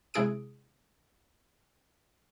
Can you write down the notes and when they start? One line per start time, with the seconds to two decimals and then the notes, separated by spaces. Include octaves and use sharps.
0.14 C3 G#3 E4 G#4 D#6 D7